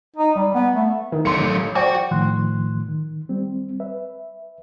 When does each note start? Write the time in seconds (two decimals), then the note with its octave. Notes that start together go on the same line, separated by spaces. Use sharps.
0.16 D#4
0.35 G3
0.55 B3
0.75 A3
1.12 D#3
1.25 G1 F#3 A4 C6 C#7
1.39 A1
1.75 F#4 C5 D5 F#5 G5 C#6
2.11 A2 D#3 F3 A3 C6 F#6
2.88 D#3
3.29 G3 C4
3.80 B4 E5